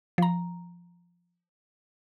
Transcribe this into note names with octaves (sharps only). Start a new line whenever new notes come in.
F3 A#5